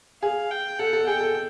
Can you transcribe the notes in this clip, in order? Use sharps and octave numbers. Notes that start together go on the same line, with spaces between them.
G#4 F5
G5
A4 F#5
A4
G#4 G5
A4